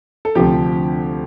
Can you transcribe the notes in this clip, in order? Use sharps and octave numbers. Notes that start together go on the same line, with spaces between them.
A4
D2 C3 F3 G4